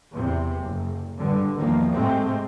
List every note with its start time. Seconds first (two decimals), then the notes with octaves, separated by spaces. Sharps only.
0.12 E2 C3
0.58 F#1
1.17 G#1 G2 D3
1.54 E2 D#3 F3 A#3
1.91 G#2 C3 G#3 A3 C4